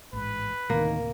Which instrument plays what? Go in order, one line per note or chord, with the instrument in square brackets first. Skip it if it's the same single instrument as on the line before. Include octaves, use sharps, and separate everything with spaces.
[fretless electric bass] A1 G#2 [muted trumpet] B4
[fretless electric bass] D2 A2 C3 [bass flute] D#3 [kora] A#3